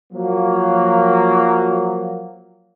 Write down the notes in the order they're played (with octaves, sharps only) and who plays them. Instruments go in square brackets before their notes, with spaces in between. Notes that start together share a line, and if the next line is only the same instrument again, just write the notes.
[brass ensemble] F3 F#3 A#3